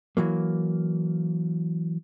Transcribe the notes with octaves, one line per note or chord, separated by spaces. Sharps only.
E3 F#3 A#3